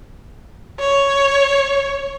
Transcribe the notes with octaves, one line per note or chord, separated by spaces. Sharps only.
C#5